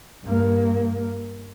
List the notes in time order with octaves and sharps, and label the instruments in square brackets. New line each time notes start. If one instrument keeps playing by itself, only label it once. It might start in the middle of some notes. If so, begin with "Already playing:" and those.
[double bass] G2 A#3